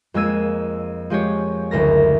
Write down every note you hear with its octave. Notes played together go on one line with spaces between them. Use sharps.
F2 G#3 A#3 E6 G#6 D#7
F3 G#3 G4 C#5
F#1 D2 A#4 A#6